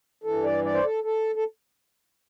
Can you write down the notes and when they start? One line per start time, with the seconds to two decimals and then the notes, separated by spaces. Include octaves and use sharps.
0.24 G2 E3 A4
0.44 D5
0.64 D5
0.74 C5
0.83 A4
1.04 A4
1.35 A4